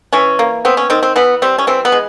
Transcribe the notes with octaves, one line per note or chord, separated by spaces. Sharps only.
E3 C#4
A#3
B3 C4
C#4
D#3 C4
C4
E3 B3
G3 C4
C#4
E3 C4
B3
G#3